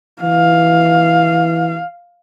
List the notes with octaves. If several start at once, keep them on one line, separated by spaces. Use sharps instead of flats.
E3 F5